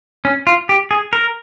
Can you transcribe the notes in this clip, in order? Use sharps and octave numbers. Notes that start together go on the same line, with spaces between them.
C#4
F4
G4
G#4
A#4